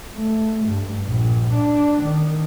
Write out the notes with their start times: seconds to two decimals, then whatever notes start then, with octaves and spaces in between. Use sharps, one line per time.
0.14 A3
0.66 G2
1.06 A#1
1.53 D4
2.02 D#3